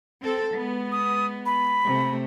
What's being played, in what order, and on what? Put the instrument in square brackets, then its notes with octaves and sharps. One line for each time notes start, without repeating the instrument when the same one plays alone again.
[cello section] C4 A4
G#3 B3
[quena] D#6
B5
[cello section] C3 A3